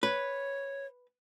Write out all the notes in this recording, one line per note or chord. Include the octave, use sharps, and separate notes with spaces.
B4 C#5